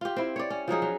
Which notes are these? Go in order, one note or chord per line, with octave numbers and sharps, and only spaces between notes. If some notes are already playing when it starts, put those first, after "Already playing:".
F4 G4
C4 E4
C#5 D5
C#4
F3 F#3 D#4 G#4
F#3